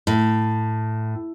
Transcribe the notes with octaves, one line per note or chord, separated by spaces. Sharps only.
A2